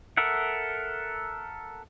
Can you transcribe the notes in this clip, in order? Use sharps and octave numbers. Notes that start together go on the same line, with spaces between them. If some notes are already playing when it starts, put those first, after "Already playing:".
A4 A#4 E5 F#5